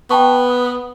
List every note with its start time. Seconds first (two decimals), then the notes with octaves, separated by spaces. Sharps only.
0.11 B3 G5 A5 C#6
0.49 D#6